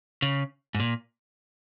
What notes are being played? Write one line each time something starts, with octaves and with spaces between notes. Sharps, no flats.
C#3
G#2
A#2